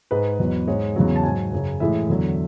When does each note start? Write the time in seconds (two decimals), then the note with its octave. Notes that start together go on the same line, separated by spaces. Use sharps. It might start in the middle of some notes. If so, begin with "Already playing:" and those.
0.11 G#2 G#3 B4
0.39 E2 B2 F#3
0.67 G#2 G#3 C#5
0.96 E2 C#3 F#3
1.16 A5
1.23 G#2 F#3 G#5
1.52 F#2 C#3 F#3
1.80 A2 E3 G#3 E5
2.09 E2 D3 F#3